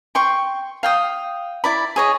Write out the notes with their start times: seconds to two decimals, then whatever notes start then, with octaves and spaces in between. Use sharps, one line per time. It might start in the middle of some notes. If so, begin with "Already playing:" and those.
0.15 G5 C6 C#6
0.83 F5 G5 D#6
1.64 E4 D5 B5
1.96 G#4 C#5 D#5